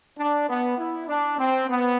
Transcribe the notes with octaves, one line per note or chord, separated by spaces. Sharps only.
D4
B3
E4
D4
C4
B3